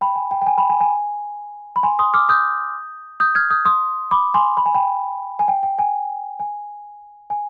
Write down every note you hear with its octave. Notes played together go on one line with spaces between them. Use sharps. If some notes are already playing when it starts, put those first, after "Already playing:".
G5 B5
G#5
G5
G5
G#5
G5 B5
G#5
G#5
B5
G#5 C6
C6 D#6
D6 F6
D#6 G6
D#6 G6
F6 G#6
D#6 G6
C6 D#6
B5 D6
G#5 C6
B5
G#5
G5 B5
G#5
G5
G5
G#5
G#5
G#5